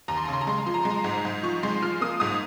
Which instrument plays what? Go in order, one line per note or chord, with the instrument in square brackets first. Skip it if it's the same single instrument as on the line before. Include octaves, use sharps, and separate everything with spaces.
[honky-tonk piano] D#2 A#5
C6
C#3 A#5
C6
A#5
G#3 C6
A#5
F3 C6
A#5
G#3 C6
A#5
G#2
G#2
F3 C#6
G#3 C6
F3 F6
A#3 D#6
G#2 D#6